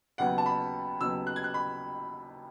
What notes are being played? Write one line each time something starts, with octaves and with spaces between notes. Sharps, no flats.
D#2 C#3 F#3 B3 F#5
A5
B5
D#2 C#3 F#3 B3 E6
F#6
G#6
F#6
B5